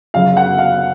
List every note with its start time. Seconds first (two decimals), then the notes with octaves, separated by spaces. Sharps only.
0.14 F#2 C#3 F#3 F5
0.37 F#5
0.58 F5